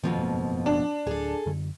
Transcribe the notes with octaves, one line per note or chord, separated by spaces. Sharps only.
F2 B2 D#3 F3 A#3 C4
F#1 G#2 A#3
D4
D1 G#4 A4
F#2 D3